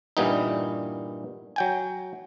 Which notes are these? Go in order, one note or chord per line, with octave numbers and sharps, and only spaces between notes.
G2 A#2 E3 G3 B3 D#4
F#3 G5 G#5